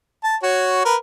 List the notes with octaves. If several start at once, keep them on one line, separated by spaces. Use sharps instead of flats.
A5
F#4 C#5
A#4 B4